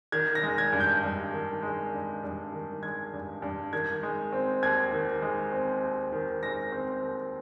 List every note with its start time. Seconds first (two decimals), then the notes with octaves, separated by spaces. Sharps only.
0.12 D#3 G#6
0.35 A#6
0.43 G#3
0.58 G#6
0.72 G2
0.80 G6
1.03 G2
1.32 D#3
1.63 G#3
1.92 G2
2.23 G2
2.53 D#3
2.83 G#3 G#6
3.13 G2
3.42 G2
3.73 D#3 G#6
4.03 G#3
4.33 C4
4.62 D#2 G#6
4.93 D#3
5.22 G#3
5.52 C4
5.82 D#2
6.12 D#3
6.43 G#3 A#6
6.72 C4
7.02 D#2